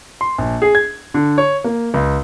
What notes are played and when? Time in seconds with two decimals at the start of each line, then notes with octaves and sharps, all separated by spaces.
0.21 C6
0.38 A#1
0.62 G#4
0.75 G#6
1.14 D3
1.38 C#5
1.64 A#3
1.94 C#2